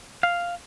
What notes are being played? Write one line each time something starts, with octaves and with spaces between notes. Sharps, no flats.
F5